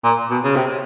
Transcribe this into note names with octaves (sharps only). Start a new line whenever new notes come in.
A#2
B2
C#3
C3